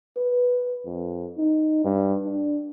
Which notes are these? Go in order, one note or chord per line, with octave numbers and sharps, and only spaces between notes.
B4
F2
D#4
G2
D4